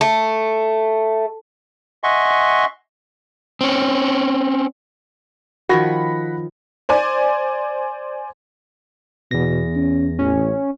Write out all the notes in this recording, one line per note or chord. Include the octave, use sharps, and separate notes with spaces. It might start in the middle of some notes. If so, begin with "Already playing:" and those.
A3
D#5 E5 F#5 G#5 C6 C#6
C4 C#4
D#3 F3 F#4 C#5 F#5 B5 A#6
C5 D5 G#5
E2 B2 A#6
C#4
A1 C#4